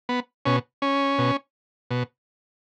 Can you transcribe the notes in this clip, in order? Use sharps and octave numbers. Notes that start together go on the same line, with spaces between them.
B3
B2 C#4
C#4
B2
B2